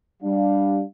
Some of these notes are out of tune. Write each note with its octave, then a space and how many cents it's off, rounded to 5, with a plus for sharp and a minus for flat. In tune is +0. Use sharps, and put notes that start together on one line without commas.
G3 +0 D4 +0 F5 +0